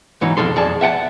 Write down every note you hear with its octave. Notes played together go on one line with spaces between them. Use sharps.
G#2 E3 F#3 D#4
F2 B2 F3 A4 C6
F2 G#4 D5 A5
E5 F#5 G5 A5